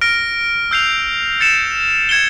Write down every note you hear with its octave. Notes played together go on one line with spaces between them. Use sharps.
F6 A#6 D7
E6 G6 C7 F7
A6 C#7 E7
G#6 C#7 E7 G7